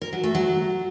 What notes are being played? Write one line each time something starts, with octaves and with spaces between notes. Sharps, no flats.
A#4
F#3
A3
F#3